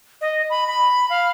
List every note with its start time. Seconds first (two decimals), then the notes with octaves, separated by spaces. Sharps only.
0.21 D#5
0.50 B5
0.67 B5
1.10 F5